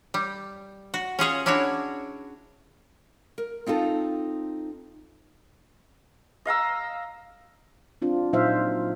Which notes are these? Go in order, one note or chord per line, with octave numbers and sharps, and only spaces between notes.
G3
F#4
C#4 F4 G#4 C#5
C#4 D4 E4 F#4 C#5
A#4
C4 D#4 F4 A4
D#5 F5 A#5 E6
C4 D4 F4
A#2 F#3 D#4 C5 E5 F5